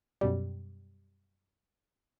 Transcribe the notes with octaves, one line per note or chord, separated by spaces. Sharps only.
F#2 B2 G3